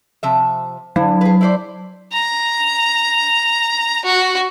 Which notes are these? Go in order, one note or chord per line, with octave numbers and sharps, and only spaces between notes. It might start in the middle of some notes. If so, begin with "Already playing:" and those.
C3 F3 E5
D3 F#3
G#4 B4
E4 C5 D5
A#5
F#4